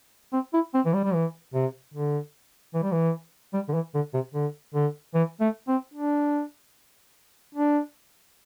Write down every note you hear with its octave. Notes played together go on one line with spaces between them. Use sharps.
C4
E4
C4
E3
G3
G3
E3
C3
D3
E3
G3
E3
G3
D3
E3
D3
C3
D3
D3
E3
A3
C4
D4
D4